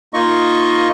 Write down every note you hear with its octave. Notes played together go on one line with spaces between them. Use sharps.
A#3 D#4 F4 D#5 C#6